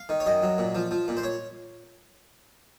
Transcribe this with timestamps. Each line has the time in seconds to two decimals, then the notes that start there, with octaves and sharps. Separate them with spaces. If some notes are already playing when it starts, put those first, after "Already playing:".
Already playing: F5
0.09 D#3
0.20 C#5
0.26 F#2 D#5
0.43 F#3
0.58 A#2
0.75 F3
0.91 F3
1.08 A#2
1.17 C5
1.23 C#5